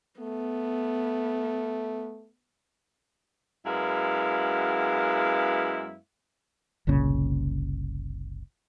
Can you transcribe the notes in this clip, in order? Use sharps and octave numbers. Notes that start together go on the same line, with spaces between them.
A3 B3
F#2 G#3 B3 E4 F5
F#1 C2 A#2 C#3